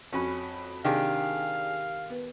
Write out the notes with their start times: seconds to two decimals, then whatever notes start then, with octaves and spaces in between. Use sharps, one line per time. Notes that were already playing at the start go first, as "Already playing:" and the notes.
0.13 F2 C#4 F#4 B5
0.85 C3 D#3 D4 G4 G#4 F5
2.10 B3